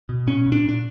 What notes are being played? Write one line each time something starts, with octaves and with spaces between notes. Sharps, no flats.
B2
A#2 C#4
A#2
D4
A#2 D4